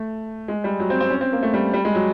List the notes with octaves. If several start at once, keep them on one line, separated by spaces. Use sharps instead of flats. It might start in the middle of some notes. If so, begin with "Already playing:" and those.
Already playing: A3
G#3
G3
F#3
C4
C4
C#4
C4
A#3
A3
G3
G3
G#3
F#3